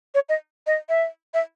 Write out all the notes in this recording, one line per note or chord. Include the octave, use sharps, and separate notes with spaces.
C#5
D#5
D#5
E5
E5